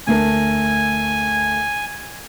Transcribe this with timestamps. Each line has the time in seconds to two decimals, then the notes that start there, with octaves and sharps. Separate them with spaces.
0.07 D2 A3 A#4 G#5